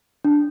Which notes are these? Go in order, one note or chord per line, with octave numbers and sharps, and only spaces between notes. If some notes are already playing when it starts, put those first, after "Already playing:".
D4